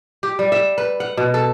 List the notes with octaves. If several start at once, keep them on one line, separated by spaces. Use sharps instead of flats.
G4
G3
E5
B4
F#5
B2
A4